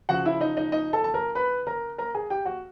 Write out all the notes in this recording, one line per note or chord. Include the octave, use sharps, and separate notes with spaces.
C#3 F3 F#4 F#5
E4 E5
D#4 D#5
D#4 D#5
D#4 D#5
A4 A5
A5
A#4 A#5
B4 B5
A#4 A#5
A#4 A#5
G#4 G#5
G4 G5
F#4 F#5